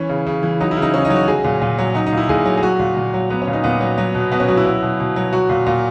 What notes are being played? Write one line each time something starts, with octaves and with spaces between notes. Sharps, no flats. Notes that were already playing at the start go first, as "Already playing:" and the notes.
Already playing: E3 C#4
C#3
C#3
E3
F#3 D#4
E4
C#3
D#4
C#3 C#4
D#4
F#3
F#4
F#3 G#4
A#2
A#2
F#3
F#3 D#4
D#4
A#2
E4
A#2 G#4
F#3
G#4
F#3 F#4
A#2
A#2
F#3
F#3 B3
C#4
A#2
D#4
A#2 B3
F#3
F#3
B2
B2 B3
C#4
F#3 F#4
E4
F#3
B2
B2
F#3
F#3 F#4
A#2
A#2